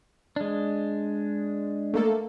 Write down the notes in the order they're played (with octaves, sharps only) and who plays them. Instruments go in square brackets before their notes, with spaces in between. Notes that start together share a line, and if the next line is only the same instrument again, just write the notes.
[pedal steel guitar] G#3 D4
[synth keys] A3 A#3 A4